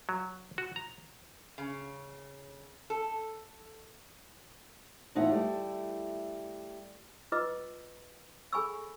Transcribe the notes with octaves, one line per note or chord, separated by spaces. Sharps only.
F#3
F#4
A#5
C#3
A4
E2 A2 D#4 F4 E5 F#5
G3 A3 E4
F4 B4 D#5 D6 E6
G#4 A4 G#5 B5 C#6 E6